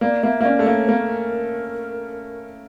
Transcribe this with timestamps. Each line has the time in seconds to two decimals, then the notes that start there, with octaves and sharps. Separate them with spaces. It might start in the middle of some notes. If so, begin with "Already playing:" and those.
0.01 A#3 D5
0.23 A#3 E5
0.41 A#3
0.45 C#4 D5
0.59 A3
0.66 A#3 C#5
0.88 A#3 A#4